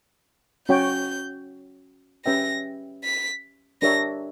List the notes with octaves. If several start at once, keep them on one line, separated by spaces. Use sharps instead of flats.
C#4 F#4 C#5 G5 G6
C#4 G4 B4 E5 G5 A#6
B6
D4 G4 A#4 C#5 E5 A#6